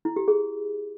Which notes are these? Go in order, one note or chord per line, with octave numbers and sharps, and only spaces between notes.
E4
G4
G#4